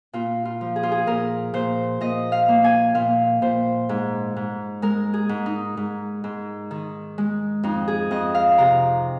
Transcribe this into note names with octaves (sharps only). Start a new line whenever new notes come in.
A#2 F4
F4
F3
G#4
F4
G#4
A#2 A#4
A#2 C5
A#2 D#5
F5
A#3
G#5
A#2 F5
A#2 C5
G#2
G#2
G#3 A#4
G#4
G#2
D#4
G#2
G#2
D#3
G#3
F2 D#4
G#4
F2 D#5
F5
C3 A#5